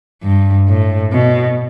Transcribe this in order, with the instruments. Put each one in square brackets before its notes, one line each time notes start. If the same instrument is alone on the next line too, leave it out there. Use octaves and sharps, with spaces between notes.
[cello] G2
A2
B2